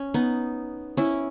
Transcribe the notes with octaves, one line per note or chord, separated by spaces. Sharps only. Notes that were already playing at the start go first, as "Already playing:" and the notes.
Already playing: C#4
B3 D#4
C#4 E4